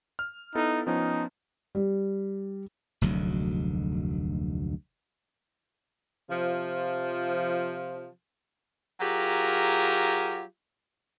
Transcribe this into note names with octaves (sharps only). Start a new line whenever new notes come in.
F6
B3 D#4 E4 A4
F3 B3 C#4 D#4
G3
F1 D2 G#2 F#3
C3 F3
F#3 F4 G4 G#4 A#4